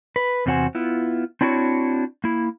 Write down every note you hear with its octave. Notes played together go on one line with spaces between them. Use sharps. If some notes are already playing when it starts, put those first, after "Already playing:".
B4
E2 C3 C4 F#4 C5 G#5
B3 E4 F4
C4 D4 E4 F#4 A#4 C#5
A#3 E4